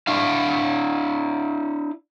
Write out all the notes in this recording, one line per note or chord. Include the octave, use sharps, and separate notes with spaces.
D4 E4 F5